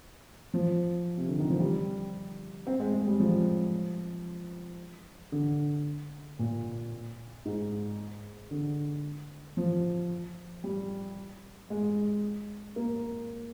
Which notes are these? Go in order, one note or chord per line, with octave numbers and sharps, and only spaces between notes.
F3
C3
D3
D#3
F3
G3
C4
G#3
G#3
G3
F3
D3
A#2
G#2
D3
F3
G3
G#3
A#3